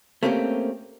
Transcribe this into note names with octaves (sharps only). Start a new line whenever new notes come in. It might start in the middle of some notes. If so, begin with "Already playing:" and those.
A3 A#3 C4 C#4 G4